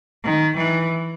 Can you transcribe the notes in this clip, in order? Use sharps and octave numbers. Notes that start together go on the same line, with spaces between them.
D#3
E3